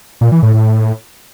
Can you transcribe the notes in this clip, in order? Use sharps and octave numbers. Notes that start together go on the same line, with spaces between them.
A#2
E3
A2
A2